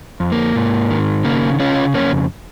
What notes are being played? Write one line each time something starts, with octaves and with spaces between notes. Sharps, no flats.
F2
A#3
G#2
D#3
C#3 A#3
C#3 C#4 F4
F2 A#3 C#4